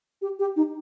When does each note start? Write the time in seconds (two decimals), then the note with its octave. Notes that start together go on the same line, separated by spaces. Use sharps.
0.22 G4
0.39 G4
0.56 D#4